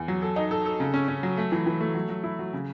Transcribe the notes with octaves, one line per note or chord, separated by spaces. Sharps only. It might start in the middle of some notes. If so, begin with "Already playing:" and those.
Already playing: E2
F#3
A4
D#4
A4
A4
C#3
C#4
C#4
F#3
A3
E3
E3
A3
F#3
F#3
E4
F#3
C#3